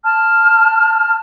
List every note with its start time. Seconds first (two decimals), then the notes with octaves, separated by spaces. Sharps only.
0.05 A5 F6